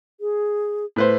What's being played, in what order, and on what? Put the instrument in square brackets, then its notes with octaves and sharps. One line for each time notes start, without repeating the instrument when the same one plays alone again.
[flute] G#4
[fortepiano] A2 B4 C5